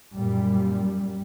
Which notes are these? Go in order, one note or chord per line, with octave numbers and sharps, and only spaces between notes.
F#2 A#2 G3